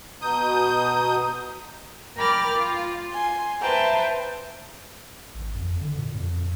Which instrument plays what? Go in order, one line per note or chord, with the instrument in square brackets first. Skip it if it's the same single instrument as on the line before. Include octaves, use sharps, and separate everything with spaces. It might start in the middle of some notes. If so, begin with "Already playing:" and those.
[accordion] B2 D#6 G6 [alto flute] A#5
[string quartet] A#4 G5 B5 D6 F6 A6
F4
G#5 C6
B4 C5 E5 G5 A5 A#5
[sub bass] G#1
F2
D3
A#2
F2
F2